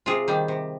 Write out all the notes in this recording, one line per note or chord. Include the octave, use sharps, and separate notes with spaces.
C3 F4 G#4
D#3 G3
C3